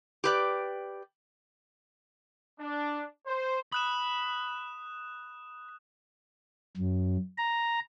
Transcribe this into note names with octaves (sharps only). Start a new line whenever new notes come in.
G4 B4 D5
D4
C5
B5 D#6 F#6 E7
F#2
A#5